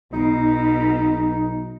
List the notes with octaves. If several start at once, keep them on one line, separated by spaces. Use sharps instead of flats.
B1 B2 D#4